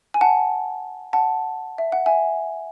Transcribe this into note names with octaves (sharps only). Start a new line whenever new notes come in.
G#5
F#5 A5
F#5 A5
E5
F#5
E5 G#5